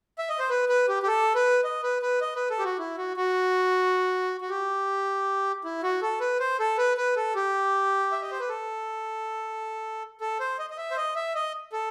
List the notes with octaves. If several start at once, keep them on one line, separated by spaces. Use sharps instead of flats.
E5
D#5
C5
B4
B4
G4
G4
A4
B4
D#5
B4
B4
D#5
B4
A4
G4
F#4
E4
F#4
F#4
F#4
G4
E4
F#4
A4
B4
C5
A4
B4
B4
A4
G4
E5
D#5
C5
B4
A4
A4
C5
D#5
D#5
E5
C5
D#5
E5
D#5
A4